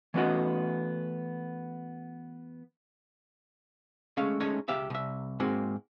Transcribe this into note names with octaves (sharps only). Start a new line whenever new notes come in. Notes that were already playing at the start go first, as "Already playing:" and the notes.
E3 A3 B3 C#4 F#4 D#5
G#3 A3 C#4 F5
G#3 A3 C#4 D#4 C#5
C#2 G4 E5 F5
C2 E5
G#2 G#3 A#3 C4 F#4